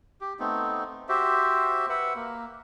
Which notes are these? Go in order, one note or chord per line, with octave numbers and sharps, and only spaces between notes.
G4
A3 B3 C4 D#4
F#4 G4 C5 E5
B4 E5 F#5
A#3